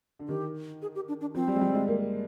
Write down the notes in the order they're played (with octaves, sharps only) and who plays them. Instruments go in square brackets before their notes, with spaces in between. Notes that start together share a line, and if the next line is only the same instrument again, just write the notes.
[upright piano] D3
[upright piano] D#3 [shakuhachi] G4
[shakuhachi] G#4
G4
D4
D4
[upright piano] F3 [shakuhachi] C4
[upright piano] G3
G#3
G3
G#3
A#3